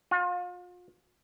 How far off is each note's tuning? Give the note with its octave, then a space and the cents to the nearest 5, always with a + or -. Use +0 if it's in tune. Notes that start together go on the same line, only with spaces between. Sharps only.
F4 +35